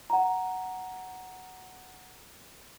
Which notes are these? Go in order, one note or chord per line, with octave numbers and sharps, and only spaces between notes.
F#5 A#5